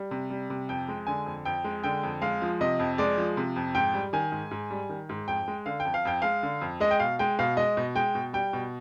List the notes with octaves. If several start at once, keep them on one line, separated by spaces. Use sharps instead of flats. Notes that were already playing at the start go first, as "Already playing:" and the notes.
Already playing: G3
C3
G3
C3
F2 G5
G#3
D3 G#5
F2
F2 G5
G#3
D3 G5
F2
G#3 F5
F3
C3 D#5
F2
G#3 D5
F3
C3
F2
G#2 G5
G3
D#3 G#5
G#2
G#2
G3
D#3
G#2
F2 G5
G#3
D3 F5
G5
F2
F5
F2 G5
G#3 F5
D3
F2
G#3 D#5
G5
B2 F5
G#3 G5
B2 F5
G#3 D#5
B2
G#3 G5
B2
G3 G5
B2